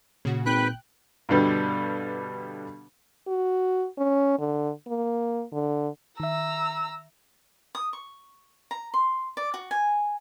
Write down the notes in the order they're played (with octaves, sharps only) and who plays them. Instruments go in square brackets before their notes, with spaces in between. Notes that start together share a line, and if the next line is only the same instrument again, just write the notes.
[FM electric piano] A#2 [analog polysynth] C#3 F#4
[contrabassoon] G#1 [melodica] B4 B5 [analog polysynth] G5 F#6
[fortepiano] G2 B2 D3 G3
[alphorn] F#4
C#4
D3
A#3
D3
[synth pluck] D#3 E5 [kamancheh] A#5 E6
[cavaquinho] D#6
C#6
A#5
C6
D5
F#4
G#5